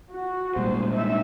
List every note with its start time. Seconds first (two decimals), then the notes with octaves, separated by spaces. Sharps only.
0.11 F#4
0.56 A#2 G3 G#3 C5
0.91 D#4 E5